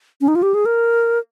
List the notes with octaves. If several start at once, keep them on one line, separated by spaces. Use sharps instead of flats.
C#4
D#4
F4
G4
G#4
A#4